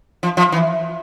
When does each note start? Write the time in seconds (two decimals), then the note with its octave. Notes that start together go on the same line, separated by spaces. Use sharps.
0.23 F3
0.37 F3
0.52 E3